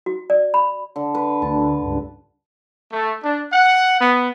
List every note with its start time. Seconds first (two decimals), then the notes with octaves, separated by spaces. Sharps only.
0.06 F#4
0.30 D5
0.54 B5
0.96 D3
1.15 B4
1.42 D2 D3 A5
1.81 C#2 G2
2.92 A3
3.23 D4
3.53 F#5
4.01 B3